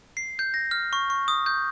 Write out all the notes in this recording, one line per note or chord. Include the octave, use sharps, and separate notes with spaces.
C7
G6
A#6
F6
C#6
C#6
D#6
G6